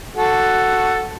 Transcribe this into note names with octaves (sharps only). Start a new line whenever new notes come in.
F#4 A4